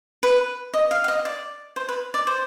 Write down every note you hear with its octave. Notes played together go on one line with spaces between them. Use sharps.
B4
D#5
F5
F5
D#5
D5
C5
B4
D5
C5